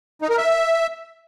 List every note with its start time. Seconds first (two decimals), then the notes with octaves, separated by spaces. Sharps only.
0.22 D#4
0.30 A#4
0.37 E5